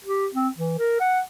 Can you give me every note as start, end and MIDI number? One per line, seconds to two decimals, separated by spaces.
0.04 0.28 67
0.34 0.49 60
0.58 0.77 52
0.79 0.99 70
1.01 1.20 78